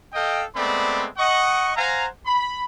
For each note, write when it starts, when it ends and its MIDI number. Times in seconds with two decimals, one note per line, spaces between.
0.13 0.43 69
0.13 0.43 75
0.13 0.43 77
0.13 0.43 79
0.55 1.07 56
0.55 1.07 57
0.55 1.07 59
0.55 1.07 60
0.55 1.07 74
0.55 1.07 83
1.18 1.71 75
1.18 1.71 78
1.18 1.71 85
1.76 2.07 72
1.76 2.07 77
1.76 2.07 78
1.76 2.07 80
1.76 2.07 82
2.26 2.65 83